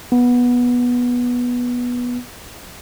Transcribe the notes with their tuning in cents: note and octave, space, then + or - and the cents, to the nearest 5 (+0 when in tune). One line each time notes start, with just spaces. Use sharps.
B3 -15